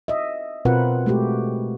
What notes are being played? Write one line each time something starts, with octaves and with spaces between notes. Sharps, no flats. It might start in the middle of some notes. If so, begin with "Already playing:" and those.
D#5 E5
B2 C4 F4 A#4 B4 F#5
G#3 A3 F#4 G4